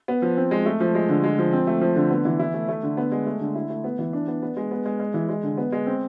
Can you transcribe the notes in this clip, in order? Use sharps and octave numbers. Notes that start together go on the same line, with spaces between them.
B3
F3
C4
G#3
A3
F3
G#3
D3
G#3
F3
C4
A3
F3
D3
B3
E3
E4
A3
A3
D3
B3
G#3
A3
D3
E4
A3
B3
E3
D4
B3
B3
G#3
B3
G#3
G#3
E3
G#3
D3
B3
G#3
C4